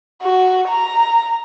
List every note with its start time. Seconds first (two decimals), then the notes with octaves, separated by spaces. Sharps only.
0.23 F#4
0.68 A#5